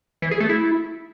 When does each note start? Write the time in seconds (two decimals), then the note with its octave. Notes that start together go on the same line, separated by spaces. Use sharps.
0.22 E3
0.31 G#4
0.40 A3
0.49 E4